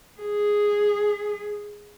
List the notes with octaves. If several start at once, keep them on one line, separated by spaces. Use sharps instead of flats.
G#4